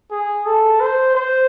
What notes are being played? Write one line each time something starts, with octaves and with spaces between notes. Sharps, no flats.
G#4
A4
C5
C5